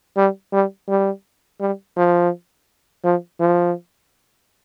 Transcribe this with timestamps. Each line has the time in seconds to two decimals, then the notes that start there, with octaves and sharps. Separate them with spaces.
0.17 G3
0.53 G3
0.88 G3
1.60 G3
1.97 F3
3.04 F3
3.40 F3